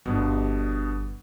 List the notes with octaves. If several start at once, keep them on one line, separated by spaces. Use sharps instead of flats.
G1 B2 B3 D4